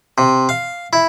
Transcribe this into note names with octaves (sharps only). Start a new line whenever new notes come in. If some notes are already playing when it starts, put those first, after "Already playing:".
C3
F5
E4